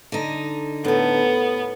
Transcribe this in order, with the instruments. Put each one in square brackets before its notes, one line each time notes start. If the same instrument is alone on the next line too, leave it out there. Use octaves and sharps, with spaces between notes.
[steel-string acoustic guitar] D3 D#4
[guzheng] A2 A4 [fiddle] B3